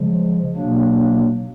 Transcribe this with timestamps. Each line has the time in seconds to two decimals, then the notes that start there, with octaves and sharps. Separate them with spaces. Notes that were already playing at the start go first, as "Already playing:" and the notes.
Already playing: C#3 F3 G#3
0.56 B2 F#3 A#3 D4